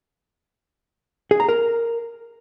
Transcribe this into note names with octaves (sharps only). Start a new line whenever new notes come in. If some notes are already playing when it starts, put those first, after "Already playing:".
G#4
A#5
A#4